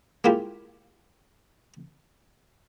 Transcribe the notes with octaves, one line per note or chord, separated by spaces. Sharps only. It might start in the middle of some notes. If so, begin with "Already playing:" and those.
G#3 A#3 E4 F4 G4